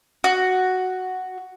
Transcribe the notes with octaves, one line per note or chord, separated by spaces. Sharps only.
F#4